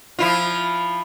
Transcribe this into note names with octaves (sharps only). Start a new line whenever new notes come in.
F3 E4 F4